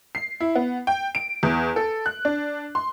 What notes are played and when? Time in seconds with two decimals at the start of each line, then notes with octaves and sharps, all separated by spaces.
0.15 C7
0.40 E4
0.55 B3
0.87 G5
1.15 D7
1.43 E2
1.76 A4
2.06 F#6
2.25 D4
2.75 C6